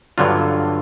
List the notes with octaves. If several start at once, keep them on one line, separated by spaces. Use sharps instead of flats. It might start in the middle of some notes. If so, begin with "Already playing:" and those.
G2 D3 F#3 F4